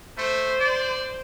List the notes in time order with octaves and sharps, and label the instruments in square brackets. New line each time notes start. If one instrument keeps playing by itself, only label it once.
[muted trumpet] A3 [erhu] C5
[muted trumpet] D5